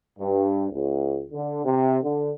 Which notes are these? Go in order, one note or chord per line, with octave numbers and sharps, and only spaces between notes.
G2
C#2
D3
C3
D3